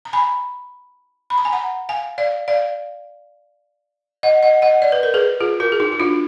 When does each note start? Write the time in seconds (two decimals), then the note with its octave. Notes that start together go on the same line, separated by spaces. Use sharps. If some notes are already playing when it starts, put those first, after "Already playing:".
0.05 A#5
0.13 G#5 B5
1.30 B5
1.38 A#5
1.45 G#5
1.52 F#5 A#5
1.89 F5 G#5
2.18 D5 F5
2.48 D5 F5
4.23 D#5 F#5
4.43 D#5 F#5
4.62 D#5 F#5
4.82 D5
4.92 B4
5.03 A#4
5.14 G#4 B4
5.40 F4 G#4
5.60 F#4 A#4
5.72 G#4
5.80 D#4 F#4
5.92 F#4
6.00 D4 F4